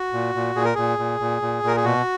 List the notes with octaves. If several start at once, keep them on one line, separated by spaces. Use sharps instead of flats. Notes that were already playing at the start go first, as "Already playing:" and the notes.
Already playing: F#4
A#2
A#2
A#2 G#4
A#4
A#2 G#4
A#2
A#2
A#2
A#2 A#4
G#4
B2 F#4